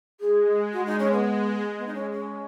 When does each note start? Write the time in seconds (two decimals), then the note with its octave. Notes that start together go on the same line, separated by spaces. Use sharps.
0.20 G#3 G#4
0.72 F#4
0.86 D#4
0.99 C#4
1.12 B3
1.77 B3
1.86 D#4
1.94 C#4
2.11 C#4